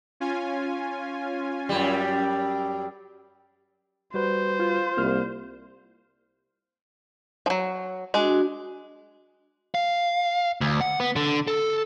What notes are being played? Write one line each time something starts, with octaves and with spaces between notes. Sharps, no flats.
C#4 F4 G#5
F#2 G3
G3 F#4 B4 C5
F4
C2 A#3 F6
F3 F#3
G#3 D4 F#4
F5
D2
F#5
B3
D3
A4